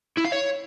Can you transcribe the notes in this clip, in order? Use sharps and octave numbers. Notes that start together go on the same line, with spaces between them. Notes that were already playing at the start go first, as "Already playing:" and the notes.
E4
F5
C#5